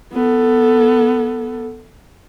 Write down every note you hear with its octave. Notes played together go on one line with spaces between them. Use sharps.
B3 A4